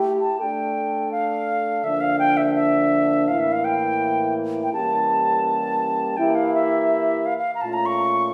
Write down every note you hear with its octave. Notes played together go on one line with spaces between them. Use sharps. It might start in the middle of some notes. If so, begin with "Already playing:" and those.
Already playing: A3 E4 G4
A5
A3 D4 A4 G5
F5
D3 F3 A#3 D4 E5
F5
G5
E5
E5
A2 E3 A#3 E4 F5
E5
F5
G5
G5
E3 G3 A#3 C#4 G4 A5
E3 A#3 E4 G4 G5
F5
E5
F5
F5
A#5
A#2 A3 C#4 F4 A5
A#5
C#6